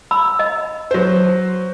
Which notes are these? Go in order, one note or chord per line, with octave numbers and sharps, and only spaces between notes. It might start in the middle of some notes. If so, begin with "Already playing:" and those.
B5 E6
D#5
F#3 C5